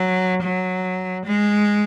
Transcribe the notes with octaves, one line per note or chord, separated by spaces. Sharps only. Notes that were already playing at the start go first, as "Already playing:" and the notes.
Already playing: F#3
F#3
G#3